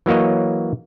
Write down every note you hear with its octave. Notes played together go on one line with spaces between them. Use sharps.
E3 F#3 A#3 C#5 D#5